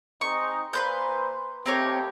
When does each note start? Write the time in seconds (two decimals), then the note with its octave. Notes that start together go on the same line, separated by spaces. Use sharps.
0.21 G#3 C4 D#4 C#6
0.73 A#2 B4 C5 C6 G6
1.66 D#2 A3 C4 G4 A#4 C#5